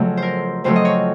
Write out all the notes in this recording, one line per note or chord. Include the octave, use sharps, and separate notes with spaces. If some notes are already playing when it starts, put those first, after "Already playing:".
Already playing: F2 C#3 F#3 A3
C5
A#4
F2 C#3 F#3 A3 C5
D#5
C#5